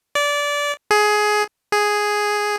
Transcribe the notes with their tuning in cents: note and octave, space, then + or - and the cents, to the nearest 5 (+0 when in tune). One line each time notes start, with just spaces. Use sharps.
D5 -20
G#4 +15
G#4 +0